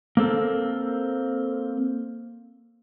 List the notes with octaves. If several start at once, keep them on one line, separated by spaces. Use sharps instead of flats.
A#3 C4 A4 A#4